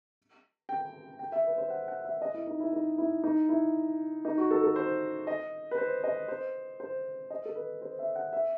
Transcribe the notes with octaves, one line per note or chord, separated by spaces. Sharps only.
G5
G5
E5
B4
C5
F#5
F#5
E5
D#5
E4
D#4
E4
D#4
E4
D#4
E4
D#4
F#4
A4
A4
C5
D#5
B4
C5
D#5
C5
C5
D#5
A4
B4
C5
E5
F#5
E5